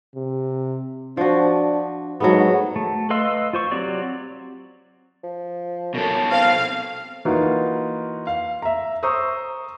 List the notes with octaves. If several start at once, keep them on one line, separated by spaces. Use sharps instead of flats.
C3
F3 D4 F#4
G#2 F#3 A3 B3
A3
B4 D#5 F5 C6 E6
F4 C5 C#6
F#3 C4 G4 D5
F3
F#2 B2 A4
C4 F5
E3 A#3 D#4 F4 F#4 B4
F5
E5 A#5
C5 A#5 C#6 D#6 E6